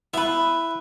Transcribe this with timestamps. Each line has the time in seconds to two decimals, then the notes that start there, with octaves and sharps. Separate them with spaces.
0.14 B3 E4 B4